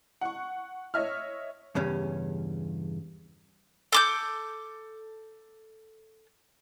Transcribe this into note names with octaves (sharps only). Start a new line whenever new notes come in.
F#5 C#6
C#5 D#5 E5 F6
E2 G2 C#3 C#4
A4 D6 G6